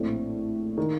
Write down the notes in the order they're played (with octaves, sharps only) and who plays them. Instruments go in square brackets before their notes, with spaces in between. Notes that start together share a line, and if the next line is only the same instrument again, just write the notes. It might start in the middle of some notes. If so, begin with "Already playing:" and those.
Already playing: [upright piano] A#1 A2 A3 C4
D#3